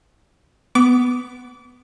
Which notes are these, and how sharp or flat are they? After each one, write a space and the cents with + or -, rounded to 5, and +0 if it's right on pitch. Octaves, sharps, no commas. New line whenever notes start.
B3 +10 D6 -30